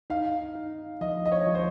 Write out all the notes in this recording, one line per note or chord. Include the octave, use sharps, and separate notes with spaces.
D#4 F5
D#4
F3 D#5
D#5
C#5
F3
C5